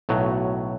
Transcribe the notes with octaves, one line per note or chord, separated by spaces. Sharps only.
B1 A2 F#3